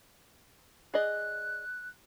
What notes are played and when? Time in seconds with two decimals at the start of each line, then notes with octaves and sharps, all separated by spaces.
0.94 G#4 D5 D#5 F#6